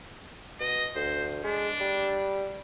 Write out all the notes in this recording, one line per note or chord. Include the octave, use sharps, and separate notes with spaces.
B2 D#5
D2 C5
G#3 D4
G3